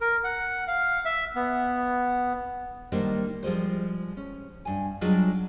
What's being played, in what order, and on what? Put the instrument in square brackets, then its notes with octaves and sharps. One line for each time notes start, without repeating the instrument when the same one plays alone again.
[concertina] A#4
F#5
F5
E5
B3
[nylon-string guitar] D#3 G3 A#3 D4 D#4 C5
F3 G3 G#3 C5
C#4
G2 G#5
F#3 G3 D4 D#4 F4 G#4